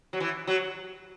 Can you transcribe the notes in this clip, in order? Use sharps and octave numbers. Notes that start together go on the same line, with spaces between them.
F#3
E3
F#3